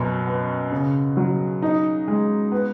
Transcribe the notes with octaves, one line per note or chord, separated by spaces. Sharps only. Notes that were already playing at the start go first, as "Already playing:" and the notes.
Already playing: F#2 B2
B3
C#3
F#3
D#4
G#3
B3